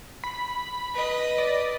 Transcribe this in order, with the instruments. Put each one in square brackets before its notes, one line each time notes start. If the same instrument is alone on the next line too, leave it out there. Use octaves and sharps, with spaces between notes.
[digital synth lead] B5
[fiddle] B4 D#5
[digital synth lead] D5